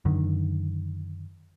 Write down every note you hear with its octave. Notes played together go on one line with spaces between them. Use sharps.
F#2 D3 D#3